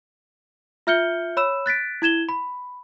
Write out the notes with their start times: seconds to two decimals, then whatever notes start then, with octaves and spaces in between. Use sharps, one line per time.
0.87 F4 E5 F6 G6 C#7 G7
1.37 C#5 B5 E6 E7
1.66 F#6 A6 B6 D7
2.02 E4 G#6 E7 G7
2.29 B5